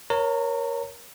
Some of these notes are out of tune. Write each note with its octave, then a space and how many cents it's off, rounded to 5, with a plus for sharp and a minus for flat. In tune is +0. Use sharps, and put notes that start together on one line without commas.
A#4 +20 C#5 +0 A#5 -35